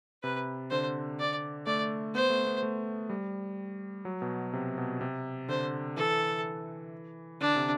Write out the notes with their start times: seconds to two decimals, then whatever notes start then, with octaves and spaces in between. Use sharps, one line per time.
0.23 C3 B4
0.71 D3 C5
1.20 D5
1.66 A3 D5
2.15 B3 C5
2.30 A3
2.47 B3
2.63 A3
3.10 G3
4.05 F#3
4.22 B2
4.53 C3
4.78 B2
5.01 C3
5.49 D3 C5
5.97 E3 A4
7.41 D3 D4
7.56 C3